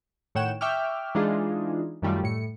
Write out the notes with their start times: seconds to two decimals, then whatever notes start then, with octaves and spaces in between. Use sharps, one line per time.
0.35 A2 D#3 C#5 F#5 G5 E7
0.61 E5 G5 C#6 D6 F6
1.15 E3 G#3 D4 D#4 F4 G#4
2.02 F#2 D#3 G3 A3 F4
2.23 A2 C#7